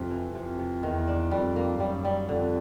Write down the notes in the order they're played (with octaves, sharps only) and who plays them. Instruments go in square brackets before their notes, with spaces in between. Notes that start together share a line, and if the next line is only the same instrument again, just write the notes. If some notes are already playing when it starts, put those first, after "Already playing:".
Already playing: [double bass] F2 [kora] C3
[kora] E3
[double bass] F2 [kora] C3
[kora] C3
[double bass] E2 [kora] D#3
[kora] D4
[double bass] F2 [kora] G3
[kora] A#3
[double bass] F#2 [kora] G3
[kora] G3
[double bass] F2 [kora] D3